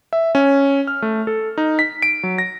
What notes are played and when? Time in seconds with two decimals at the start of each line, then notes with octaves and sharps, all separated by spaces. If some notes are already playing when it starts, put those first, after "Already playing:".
0.13 E5
0.35 C#4
0.87 F6
1.02 A3
1.27 A4
1.58 D#4
1.79 B6
2.02 D7
2.23 F#3
2.38 A#6